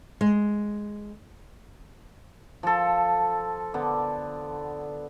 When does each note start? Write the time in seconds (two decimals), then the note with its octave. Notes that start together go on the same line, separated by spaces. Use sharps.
0.21 G#3
2.63 F3 A4
3.74 D3 B3